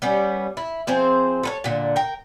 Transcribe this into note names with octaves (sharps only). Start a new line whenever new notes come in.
G3 B3 C#4
E4
F3 C4 G#4 C5
A4 B4 C#5
A#2 D3
A#4 G5